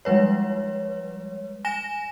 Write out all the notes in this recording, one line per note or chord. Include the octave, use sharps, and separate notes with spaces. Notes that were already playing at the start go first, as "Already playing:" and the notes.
F3 G3 G#3 B4 C#5
G#5 A#6 E7